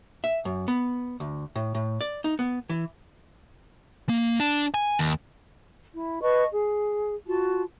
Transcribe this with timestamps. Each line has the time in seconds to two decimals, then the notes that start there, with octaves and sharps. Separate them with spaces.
0.24 E5
0.45 F#2
0.68 B3
1.20 D2
1.55 A2
1.75 A2
2.01 D5
2.24 D#4
2.39 B3
2.69 E3
4.09 A#3
4.40 D4
4.74 G#5
4.99 D#2
5.94 E4
6.21 B4 D#5 A5 C#6
6.52 G#4
7.27 F4 F#4 A5